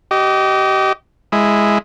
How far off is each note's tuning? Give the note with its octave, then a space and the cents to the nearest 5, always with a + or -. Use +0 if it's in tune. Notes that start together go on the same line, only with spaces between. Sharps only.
G4 -30 D#5 +0
G#3 +0 E4 +5